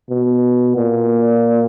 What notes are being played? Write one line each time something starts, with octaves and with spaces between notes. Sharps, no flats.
B2
A#2